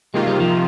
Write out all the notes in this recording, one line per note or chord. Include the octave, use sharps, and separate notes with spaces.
C3 D#3 G#3 A#3 F4
G3
F3